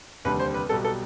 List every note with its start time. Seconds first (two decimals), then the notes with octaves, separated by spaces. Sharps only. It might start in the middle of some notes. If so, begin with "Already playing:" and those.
0.25 F1 D#2 D3 G3 B4
0.40 C5
0.54 B4
0.69 B1 B2 G3 A4
0.84 A4